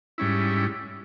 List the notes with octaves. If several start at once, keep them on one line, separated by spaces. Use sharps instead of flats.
G#2 G3 C#4 E4